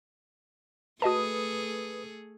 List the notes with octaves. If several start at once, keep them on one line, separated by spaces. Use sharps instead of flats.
A3 F#4 G#4 A4 B4 D#5 A5 D#6